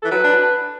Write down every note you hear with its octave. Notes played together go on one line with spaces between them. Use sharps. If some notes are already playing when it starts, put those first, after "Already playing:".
E3 A4
F#3 B4
D4